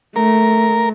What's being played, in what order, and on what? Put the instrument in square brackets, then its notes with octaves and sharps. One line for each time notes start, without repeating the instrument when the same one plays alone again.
[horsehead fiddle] A3 [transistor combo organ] A#4